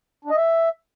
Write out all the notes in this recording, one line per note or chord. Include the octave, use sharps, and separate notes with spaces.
D4
D#5
E5